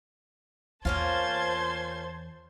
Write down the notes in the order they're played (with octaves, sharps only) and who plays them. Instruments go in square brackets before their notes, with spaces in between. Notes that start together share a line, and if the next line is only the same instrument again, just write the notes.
[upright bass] E2 [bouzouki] A#3 C#4 F4 [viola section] C5 [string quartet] A5 C6 G#6